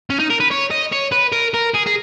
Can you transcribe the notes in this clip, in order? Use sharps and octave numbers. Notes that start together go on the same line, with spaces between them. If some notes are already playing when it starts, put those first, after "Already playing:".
C#4
D#4
A#4
B4
C#5
D#5
C#5
B4
A#4
A#4
G#4
G#4